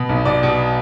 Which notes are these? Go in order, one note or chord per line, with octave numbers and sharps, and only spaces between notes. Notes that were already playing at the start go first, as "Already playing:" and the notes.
Already playing: B2
B1
B2 D5
B2